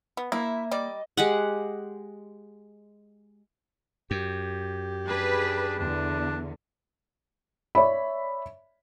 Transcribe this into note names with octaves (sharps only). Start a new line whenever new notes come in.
B3
A#3 E4 E5
G3 D5 D#5
G#3 G4 F#5
F#2 G4
D4 G#4 B4
E2 D3 D4
C#5 D5 E5 B5